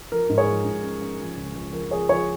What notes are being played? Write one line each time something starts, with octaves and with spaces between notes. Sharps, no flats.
F3 A#4
G#2
G#4 C#5
F3
G#2
C#4
C#4
F3
C#2
C#2
F3 A#4
F3 G#4 C#5
F3 G#4 C#5